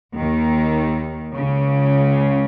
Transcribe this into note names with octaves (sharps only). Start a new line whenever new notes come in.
D#2 D#3
C#2 C#3